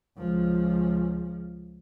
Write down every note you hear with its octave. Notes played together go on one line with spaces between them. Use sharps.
C#2 F3